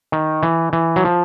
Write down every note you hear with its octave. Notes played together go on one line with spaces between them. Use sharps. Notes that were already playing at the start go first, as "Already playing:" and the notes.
D#3
E3
E3
F#3
F3